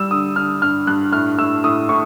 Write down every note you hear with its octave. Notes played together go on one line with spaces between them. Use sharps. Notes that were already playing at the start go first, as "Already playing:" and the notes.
Already playing: G3 E6
D3 D#6
D3 F6
G2 F6
G2 F#6
A2 F6
A2 E6
A2 D#6
A2 C#6